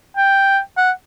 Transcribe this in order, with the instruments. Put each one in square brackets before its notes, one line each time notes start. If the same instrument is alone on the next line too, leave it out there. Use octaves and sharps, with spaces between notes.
[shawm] G5
F#5